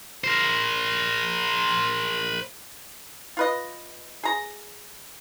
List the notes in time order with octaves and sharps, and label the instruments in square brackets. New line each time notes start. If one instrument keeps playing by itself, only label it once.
[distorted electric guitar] A#4 C5
[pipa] F4 B4 D#5
G#4 A#5